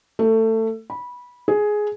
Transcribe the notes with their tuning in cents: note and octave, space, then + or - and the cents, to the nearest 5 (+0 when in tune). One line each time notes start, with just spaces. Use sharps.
A3 +20
B5 -15
G#4 +10